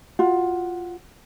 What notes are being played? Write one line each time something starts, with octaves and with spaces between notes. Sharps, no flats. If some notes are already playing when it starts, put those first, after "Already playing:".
F4 F#4